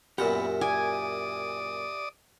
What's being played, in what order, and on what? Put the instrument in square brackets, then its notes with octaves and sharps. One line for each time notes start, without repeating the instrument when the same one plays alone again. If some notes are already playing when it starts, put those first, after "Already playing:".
[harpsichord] F#2 A#2 F#5 [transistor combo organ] B3 [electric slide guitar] G4 E5
[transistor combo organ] D5 D#6 [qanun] G#5